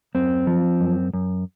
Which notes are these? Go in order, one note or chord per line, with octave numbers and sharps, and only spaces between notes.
F#2 C4
F3
F#2
F#2